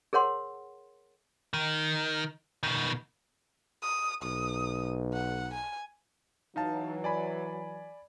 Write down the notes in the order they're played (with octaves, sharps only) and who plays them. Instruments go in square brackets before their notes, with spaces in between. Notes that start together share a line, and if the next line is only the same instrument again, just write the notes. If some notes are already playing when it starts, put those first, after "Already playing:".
[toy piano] G#4 A#4 C#5 F#5 C6
[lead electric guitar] D#3
B2 D#3
[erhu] D#6
[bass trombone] B1 [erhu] D#6
[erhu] F#5
G#5
[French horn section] E3 F#3 [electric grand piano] D#4 F5 A5
[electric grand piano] D5 G#5 B5